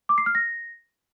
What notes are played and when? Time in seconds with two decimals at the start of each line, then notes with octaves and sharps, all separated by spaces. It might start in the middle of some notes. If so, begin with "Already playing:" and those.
0.09 D6
0.18 C7
0.26 F6
0.35 A#6